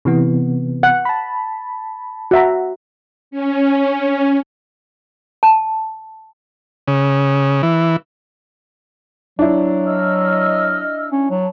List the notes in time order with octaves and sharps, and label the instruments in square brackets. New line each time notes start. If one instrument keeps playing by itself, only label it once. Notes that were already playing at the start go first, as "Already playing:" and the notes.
[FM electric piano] C3 E3 B3
[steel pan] F#5
[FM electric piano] A5 B5
[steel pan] F#4 E5 A#5
[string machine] C#4
[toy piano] A5
[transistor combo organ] C#3
E3
[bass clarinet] F#3 [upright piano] D4 E4
[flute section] D#5 E6 F6
[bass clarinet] C#4
[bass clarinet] F#3 [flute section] A5